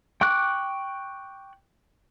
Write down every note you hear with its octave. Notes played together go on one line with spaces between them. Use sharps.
G5 C#6 D6 F#6